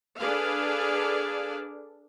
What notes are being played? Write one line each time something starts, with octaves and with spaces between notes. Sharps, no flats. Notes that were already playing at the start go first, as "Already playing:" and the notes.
D4 G#4 A4 B4 D5 F5